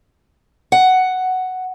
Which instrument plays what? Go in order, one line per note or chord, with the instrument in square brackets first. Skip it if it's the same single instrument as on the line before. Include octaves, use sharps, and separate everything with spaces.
[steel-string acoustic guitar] F#5